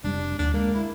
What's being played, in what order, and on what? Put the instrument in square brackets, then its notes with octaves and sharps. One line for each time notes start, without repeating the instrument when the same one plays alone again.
[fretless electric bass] F1 G3 [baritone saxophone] D4
[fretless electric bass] D2 [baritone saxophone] D4
[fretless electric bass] G#3 [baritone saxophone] A#3
[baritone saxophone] E4